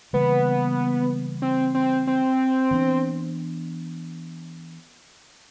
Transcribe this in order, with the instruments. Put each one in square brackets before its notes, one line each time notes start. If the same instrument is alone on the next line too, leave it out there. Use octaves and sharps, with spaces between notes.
[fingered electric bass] C#3 E3 G3 A#3 [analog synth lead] B3
[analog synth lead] C4
C4
C4
[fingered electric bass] E3 G3 B3 D4